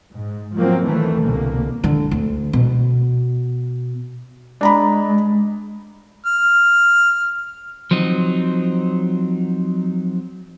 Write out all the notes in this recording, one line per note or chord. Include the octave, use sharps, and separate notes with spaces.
G#2
F3 F#3 A#3 C4
E2 D#3 E3 A3
C2 B2 D3 A#3
D3
D2
B2
G#3 D4 A#5 B5
F6
F3 F#3 C4 D#4